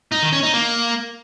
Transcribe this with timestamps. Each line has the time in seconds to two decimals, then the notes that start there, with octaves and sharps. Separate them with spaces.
0.12 D#4
0.22 D#3
0.33 C#4
0.43 D#4
0.54 A#3